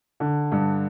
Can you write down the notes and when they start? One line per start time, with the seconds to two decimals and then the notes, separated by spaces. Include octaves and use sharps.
0.20 D3
0.52 G2